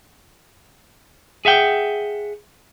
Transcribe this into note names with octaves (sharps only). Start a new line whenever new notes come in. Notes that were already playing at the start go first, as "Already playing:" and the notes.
G#4 E5 F#5 G5